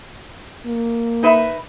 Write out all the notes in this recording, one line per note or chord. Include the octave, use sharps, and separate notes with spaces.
A#3
D#4 B4 E5